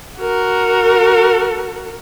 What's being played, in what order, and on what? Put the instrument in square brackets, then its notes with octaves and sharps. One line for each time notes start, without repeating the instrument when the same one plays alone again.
[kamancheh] F#4 A#4